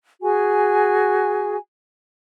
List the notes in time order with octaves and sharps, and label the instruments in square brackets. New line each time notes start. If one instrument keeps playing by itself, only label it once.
[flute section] F#4 G#4 G#5